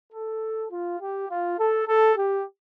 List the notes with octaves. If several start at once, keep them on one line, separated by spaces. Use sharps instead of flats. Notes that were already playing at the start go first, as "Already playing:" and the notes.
A4
F4
G4
F4
A4
A4
G4